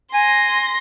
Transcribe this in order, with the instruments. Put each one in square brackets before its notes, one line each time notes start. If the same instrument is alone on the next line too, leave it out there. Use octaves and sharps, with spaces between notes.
[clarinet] G#5 [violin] C6 A#6